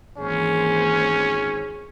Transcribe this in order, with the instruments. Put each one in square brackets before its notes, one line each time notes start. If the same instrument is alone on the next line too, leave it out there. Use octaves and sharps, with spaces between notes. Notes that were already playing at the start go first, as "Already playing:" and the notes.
[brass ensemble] G#1 G#4 [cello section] E3 A#3 C5 [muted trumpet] C#4